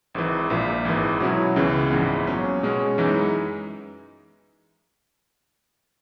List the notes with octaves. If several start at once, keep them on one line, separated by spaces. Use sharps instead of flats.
G#1 G#2 E3
A#1 A#2 A#3
G#1 G#2 E3
B2 F#3 C#4 E4
C#2 C#3 E3
A#1 G#2 E3 B3
A#2 F#3 C#4
B2 G#3 C#4
F#2 E3 G#3 D#4